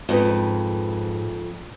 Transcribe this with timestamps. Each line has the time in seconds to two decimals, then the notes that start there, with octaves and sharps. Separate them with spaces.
0.09 F2 G#2 B4